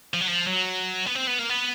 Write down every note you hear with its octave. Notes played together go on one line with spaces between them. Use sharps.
F3
F#3
F3
F#3
B3
C4
B3
A#3
B3